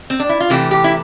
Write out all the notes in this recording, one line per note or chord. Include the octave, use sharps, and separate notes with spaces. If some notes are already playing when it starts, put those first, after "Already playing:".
C4
D4
E4
F4
C3 E3 A3 G4
G4
E4